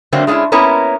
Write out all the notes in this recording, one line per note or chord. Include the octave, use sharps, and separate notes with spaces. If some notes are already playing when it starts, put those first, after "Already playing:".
D3 F#3 A3 A#3 C4
G#3 A3 C#4 D4 E4
A#3 B3 C#4 E4 A#4